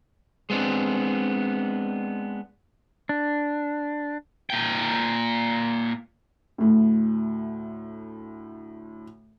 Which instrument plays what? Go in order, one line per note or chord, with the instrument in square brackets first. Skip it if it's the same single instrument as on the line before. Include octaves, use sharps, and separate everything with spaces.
[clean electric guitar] G#3 B3 C4 D4
[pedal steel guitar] D4
[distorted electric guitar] A#2 G5
[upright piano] D2 A2